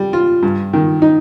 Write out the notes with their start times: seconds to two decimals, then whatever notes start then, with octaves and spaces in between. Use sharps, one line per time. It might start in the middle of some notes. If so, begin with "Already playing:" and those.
Already playing: G3
0.13 F4
0.43 G2
0.73 D#3
1.02 D#4